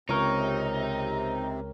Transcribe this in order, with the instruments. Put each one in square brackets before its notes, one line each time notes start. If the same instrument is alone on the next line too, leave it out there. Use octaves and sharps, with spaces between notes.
[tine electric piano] C#2 A#4 [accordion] C3 C4 [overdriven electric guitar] D#4 [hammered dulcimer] C#5